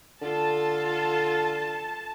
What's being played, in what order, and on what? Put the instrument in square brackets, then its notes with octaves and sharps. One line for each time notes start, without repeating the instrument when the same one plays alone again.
[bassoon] D3 [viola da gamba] F4 A4 [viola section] A5